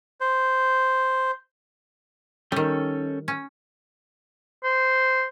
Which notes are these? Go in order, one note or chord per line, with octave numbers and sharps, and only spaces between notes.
C5
D#3 G3 C#4 A4 G5
C#4
C5